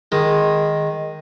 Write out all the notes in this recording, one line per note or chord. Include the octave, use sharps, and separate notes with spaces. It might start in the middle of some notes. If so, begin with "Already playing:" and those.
D#3 G#3